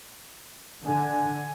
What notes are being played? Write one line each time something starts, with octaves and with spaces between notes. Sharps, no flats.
D3 G#5